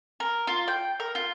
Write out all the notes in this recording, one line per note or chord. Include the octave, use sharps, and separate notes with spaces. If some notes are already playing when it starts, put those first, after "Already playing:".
A#4
F4
G5
A#4
F4